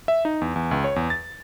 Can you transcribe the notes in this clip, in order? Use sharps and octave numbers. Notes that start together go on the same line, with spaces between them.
E5
D#4
E2
E2
C#2
C#5
E2
A6